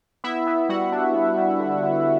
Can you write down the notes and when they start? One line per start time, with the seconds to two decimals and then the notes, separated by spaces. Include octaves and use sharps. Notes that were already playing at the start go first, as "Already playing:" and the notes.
0.24 B3 E4 E5
0.47 B3
0.69 G3 F#4 F#5
0.92 D4
1.15 B3
1.37 G3
1.60 D3
1.83 D3